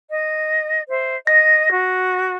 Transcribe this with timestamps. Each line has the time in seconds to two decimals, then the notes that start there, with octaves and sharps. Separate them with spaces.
0.09 D#5
0.89 C5 E5
1.27 D#5 A#6
1.72 F#4